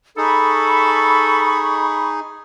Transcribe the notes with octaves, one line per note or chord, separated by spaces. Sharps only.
D#4 G#4 A4 B5 C#6